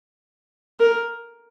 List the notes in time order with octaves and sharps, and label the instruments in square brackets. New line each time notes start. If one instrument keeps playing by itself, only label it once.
[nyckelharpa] A#4